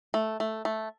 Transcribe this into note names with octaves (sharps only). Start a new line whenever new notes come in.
A3
A3
A3